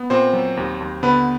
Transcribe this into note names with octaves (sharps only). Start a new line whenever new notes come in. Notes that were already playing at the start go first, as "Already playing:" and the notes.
Already playing: B3
A#2 C4 C5
F#3
D#2
D#2
D3 B3 B4